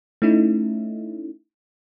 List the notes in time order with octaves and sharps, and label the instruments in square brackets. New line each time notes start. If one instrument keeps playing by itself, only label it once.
[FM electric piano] A3 C#4 D#4 E4